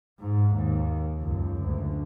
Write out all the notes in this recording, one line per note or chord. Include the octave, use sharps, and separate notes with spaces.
G#2
D#2
C#2 F#2
D2